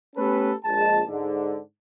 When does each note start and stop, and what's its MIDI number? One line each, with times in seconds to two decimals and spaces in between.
0.16 0.52 57
0.16 0.52 59
0.16 0.52 61
0.16 0.52 67
0.16 0.52 69
0.16 0.52 71
0.64 1.00 34
0.64 1.00 56
0.64 1.00 81
1.09 1.59 44
1.09 1.59 50